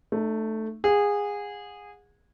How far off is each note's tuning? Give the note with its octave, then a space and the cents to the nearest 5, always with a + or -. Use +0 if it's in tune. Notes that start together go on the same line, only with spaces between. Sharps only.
A3 +0 D#4 -45
G#4 -20 F#5 -35